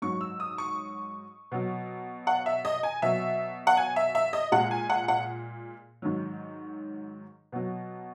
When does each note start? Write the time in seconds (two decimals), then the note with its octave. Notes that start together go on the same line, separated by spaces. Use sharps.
0.02 G#2 F#3 C#6
0.21 E6
0.40 D#6
0.58 C#6
1.52 B2 F#3
2.27 F#5
2.46 E5
2.65 D#5
2.83 G#5
3.02 B2 F#3 E5
3.67 F#5
3.77 G#5
3.96 E5
4.15 E5
4.33 D#5
4.52 A#2 G#3 F#5
4.71 G#5
4.90 F#5
5.08 F#5
6.02 G#2 D#3 F#3
7.52 B2 F#3